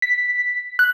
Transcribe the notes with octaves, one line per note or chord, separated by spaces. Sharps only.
B6
F#6